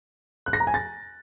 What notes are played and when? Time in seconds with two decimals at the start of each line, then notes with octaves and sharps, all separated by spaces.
0.46 F#6
0.53 A#6
0.60 A#5
0.67 G#5
0.74 A6